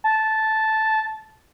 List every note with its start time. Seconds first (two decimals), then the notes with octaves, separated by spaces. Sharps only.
0.04 A5